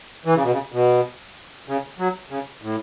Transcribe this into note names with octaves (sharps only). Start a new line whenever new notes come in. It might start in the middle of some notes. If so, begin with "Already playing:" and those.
E3
C#3
B2
C#3
B2
C#3
F#3
C#3
A2